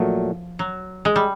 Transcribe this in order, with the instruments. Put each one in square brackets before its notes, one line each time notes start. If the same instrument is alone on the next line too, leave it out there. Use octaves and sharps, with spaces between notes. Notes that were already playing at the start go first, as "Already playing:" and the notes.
Already playing: [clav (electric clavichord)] A#2 F#3 A3 [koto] F3
[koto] F#3
G#3
G3